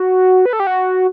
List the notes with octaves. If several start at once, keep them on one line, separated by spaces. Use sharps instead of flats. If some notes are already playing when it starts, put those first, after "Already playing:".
Already playing: F#4
B4
A4
G4
F#4